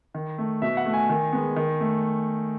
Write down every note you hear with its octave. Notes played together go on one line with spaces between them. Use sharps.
D#3
A3
B2 E5
F#5
A3
G#5
D#3
G#3 B3
D#3
A3